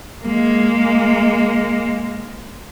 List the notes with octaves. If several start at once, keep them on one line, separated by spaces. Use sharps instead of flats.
G#3 A#3